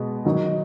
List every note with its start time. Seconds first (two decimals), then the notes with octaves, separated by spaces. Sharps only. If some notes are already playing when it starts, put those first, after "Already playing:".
Already playing: B2 G#3 B3
0.25 D#3 F#3 D#4